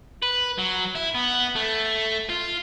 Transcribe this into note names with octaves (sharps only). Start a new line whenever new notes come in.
B4
F#3
E4
B3
A3
F4